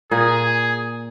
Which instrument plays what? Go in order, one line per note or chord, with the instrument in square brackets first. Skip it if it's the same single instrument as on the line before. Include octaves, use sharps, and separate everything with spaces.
[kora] A#2 [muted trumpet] G#4